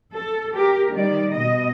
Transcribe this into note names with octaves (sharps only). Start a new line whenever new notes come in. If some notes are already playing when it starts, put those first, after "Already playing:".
A4
G4 A#4
D#3 G3 D5
B2 D#5